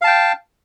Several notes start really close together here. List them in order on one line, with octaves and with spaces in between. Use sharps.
F5 A5 G5